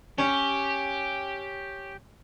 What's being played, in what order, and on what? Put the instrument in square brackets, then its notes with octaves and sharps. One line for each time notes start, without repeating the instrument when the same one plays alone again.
[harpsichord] C#4 [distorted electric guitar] G4